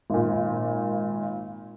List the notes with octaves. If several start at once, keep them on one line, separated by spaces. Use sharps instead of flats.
G#1 A#2